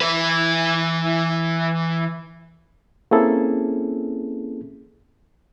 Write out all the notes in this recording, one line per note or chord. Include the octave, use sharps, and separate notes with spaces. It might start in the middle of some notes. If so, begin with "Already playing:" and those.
E3 B4
A#3 C4 C#4 E4 G#4 A4